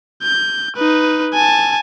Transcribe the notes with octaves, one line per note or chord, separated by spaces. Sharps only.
G6
D#4 B4
G#5 A5